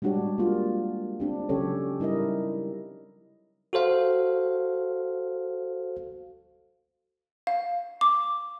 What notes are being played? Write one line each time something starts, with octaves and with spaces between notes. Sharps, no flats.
G3 G#3 D4 F#4 G4 C#5
A#3 F4
C4 D4 G4
C#3 F#3 C#4 G4 A4 C#5
G3 D#4 E4 A#4 D#5
F#4 A4 C5 F5
F5
D6